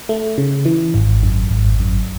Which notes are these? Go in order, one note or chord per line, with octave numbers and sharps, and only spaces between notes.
A3
C#3
E3
G#1
F#2
G#1
F#2